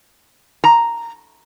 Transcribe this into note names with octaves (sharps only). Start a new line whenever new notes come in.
A#5